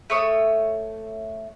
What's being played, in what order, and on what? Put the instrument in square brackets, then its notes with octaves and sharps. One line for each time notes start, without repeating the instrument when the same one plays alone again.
[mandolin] A3 C#5 D#6